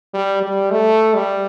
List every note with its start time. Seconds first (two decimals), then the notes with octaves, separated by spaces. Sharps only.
0.14 G3
0.43 G3
0.71 A3
1.15 G3